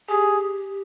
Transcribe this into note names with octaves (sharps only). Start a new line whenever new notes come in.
G4 G#4